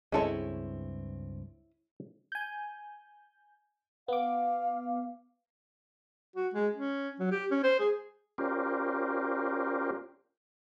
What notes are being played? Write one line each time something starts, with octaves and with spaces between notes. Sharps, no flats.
C#2 G2 G#3 C4 C#4 E4 A4 C#5
G#5 G6
B3 F5 D6
F#4
G#3
C#4
F#3
G4
C#4
C5
G#4
C#4 F4 G4 A#4 C5 D5